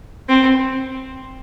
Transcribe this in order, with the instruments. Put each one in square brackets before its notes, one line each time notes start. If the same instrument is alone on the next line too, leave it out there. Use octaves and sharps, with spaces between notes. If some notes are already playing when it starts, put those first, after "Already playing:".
[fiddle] C4